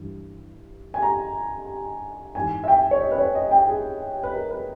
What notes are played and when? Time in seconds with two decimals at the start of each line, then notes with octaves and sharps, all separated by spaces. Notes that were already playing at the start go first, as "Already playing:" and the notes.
Already playing: G2 E3
0.94 G#5
1.02 A#5
2.35 G#2 E3 G#5
2.64 E5
2.68 G5
2.91 C#5
3.02 D#5
3.11 B4
3.18 C#5
3.35 D#5
3.51 G5
3.68 G#4
4.24 B4
4.34 A#4
4.51 B4